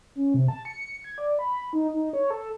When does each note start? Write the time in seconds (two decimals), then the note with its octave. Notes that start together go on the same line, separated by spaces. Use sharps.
0.16 C#4
0.34 C3
0.48 A5
0.65 C#7
1.04 G#6
1.18 D5
1.39 B5
1.73 D#4
1.94 D#4
2.13 C#5
2.30 A4